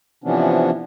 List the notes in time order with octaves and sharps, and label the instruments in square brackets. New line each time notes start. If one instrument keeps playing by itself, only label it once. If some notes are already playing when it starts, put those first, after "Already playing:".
[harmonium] C3 E3 F3 B3 C#4 D4